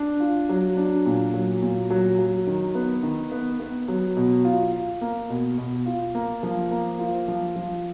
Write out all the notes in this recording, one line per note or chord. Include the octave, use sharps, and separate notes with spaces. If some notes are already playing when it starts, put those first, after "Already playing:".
Already playing: D4
F4
F#3
D4
A#2
F#3
A#2
F#3
F#3
D#3
B3
D#3
B3
B3
F#3
B2
F4
F4
A#3
B2
B2
F4
A#3
F3
A#3
F4
F3
F3